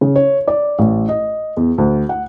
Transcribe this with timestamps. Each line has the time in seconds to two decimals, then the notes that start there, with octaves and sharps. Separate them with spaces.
0.01 C#3
0.16 C#5
0.48 D5
0.79 A1
1.09 D#5
1.57 E2
1.78 D2
2.09 F#5